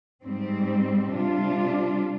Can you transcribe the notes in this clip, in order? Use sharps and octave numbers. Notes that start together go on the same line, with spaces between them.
G#2 G3 C4
C3 G3 D4 F4